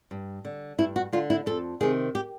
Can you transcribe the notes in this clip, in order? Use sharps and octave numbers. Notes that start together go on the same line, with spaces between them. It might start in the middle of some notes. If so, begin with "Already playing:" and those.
G2
D3
G2 E4
F#4
D3 F4
E4
F2 A4
C3 D#3 G#4
G4